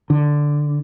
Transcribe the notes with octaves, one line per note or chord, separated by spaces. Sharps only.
D3